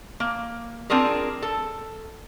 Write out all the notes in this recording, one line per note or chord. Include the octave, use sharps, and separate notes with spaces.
A#3
C4 D4 F4 G#4 A#4
A4